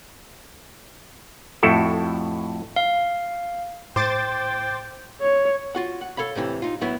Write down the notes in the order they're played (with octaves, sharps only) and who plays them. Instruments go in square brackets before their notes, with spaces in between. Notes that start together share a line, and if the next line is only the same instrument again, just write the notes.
[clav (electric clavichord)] F2 A2 E4 F#4 A4
[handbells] F5
[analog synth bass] A2 [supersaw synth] C5 D6 A6 [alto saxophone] G5
[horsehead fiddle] C#5
[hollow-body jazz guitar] F4 F#4 F#5
F#5
A4 C#5 F5 B5
A2 C3 D#3 E3
D#4 F4
A2 F#3 B3 E4